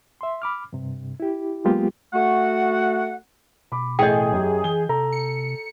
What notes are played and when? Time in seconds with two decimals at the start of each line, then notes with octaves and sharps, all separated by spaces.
0.21 E5 C6
0.42 B5 D6 F6
0.73 G2 C3
1.20 E4 G4
1.64 F#3 G#3 A#3 B3 F4 G4
2.13 A3 F#4 F#5
3.72 B2 B5 D6
3.99 A1 A3 G#4 D#5 G5 G6
4.32 F#2 G4
4.64 E3 G7
4.89 C3 A4 A#5
5.13 C#7